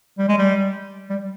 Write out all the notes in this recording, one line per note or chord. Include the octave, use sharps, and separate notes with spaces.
G3
G#3
G3
G3